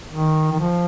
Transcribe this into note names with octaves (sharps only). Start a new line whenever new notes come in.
D#3
D#3
F3